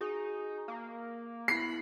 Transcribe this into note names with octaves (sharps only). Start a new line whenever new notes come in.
D#4 F#4 G#4
A#3 F5
B3 E4 B5 C7